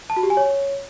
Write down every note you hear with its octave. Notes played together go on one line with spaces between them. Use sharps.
A5
F#4
G4
G#5
C#5